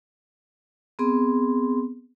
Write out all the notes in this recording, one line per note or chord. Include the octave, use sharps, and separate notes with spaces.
B3 C4 G#4 C6